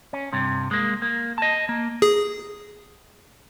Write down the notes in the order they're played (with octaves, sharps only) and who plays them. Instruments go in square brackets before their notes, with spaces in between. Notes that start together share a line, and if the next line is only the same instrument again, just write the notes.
[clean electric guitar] C#4
G2 C3
G#3 A#3
A#3
D#5 A5
A#3
[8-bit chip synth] G#4